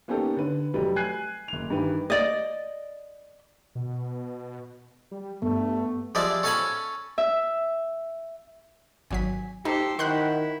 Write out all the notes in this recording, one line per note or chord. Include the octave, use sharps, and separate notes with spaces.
A#3 B3 C#4 D#4 G4 A4
D3 B4
F1 F#3 G3 B4
G#5 F#6 G#6 C7
F#1 F7
G2 D#3 E3 B4
D5 D#5
B2
G3
G2 A3 B3
F3 G3 G#3 D5 E5
C#4 A4 F5 G#5 A5 B5
E5
G#1 F#3 G#5 B6
D#4 G4 A4 C5
D#3 E4 F#4 F#5 G5 C6 F#6